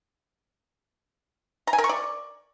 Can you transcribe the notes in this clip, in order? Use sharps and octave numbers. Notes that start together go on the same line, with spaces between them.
A#5
G#5
A#4
C#6
D5